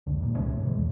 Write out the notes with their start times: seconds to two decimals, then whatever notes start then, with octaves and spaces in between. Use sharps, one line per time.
0.07 F1 C#2 D3
0.20 E2 A#2
0.37 C#2 C3 A3 C#4
0.51 G#2
0.65 B2 E3 F#3 G#3
0.78 E2